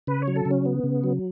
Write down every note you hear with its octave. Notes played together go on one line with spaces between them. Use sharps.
C#3 B4
C#5
F#3
A4
C#3
C#4
B3
C#3
F#3